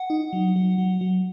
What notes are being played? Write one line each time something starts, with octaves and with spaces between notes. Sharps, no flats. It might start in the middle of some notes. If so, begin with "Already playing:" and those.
Already playing: F#5
D#4
F#3
F#3
F#3
F#3